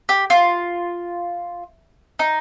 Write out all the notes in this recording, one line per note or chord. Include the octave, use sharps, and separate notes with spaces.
G4
F4
D#4